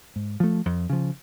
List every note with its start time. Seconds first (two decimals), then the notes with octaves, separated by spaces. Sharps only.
0.16 G#2
0.40 F3 A3
0.66 F2
0.90 C#3 F3